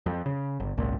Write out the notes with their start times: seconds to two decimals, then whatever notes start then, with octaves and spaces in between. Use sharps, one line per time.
0.06 F2
0.26 C#3
0.60 G1
0.77 G#1 C#2 A#2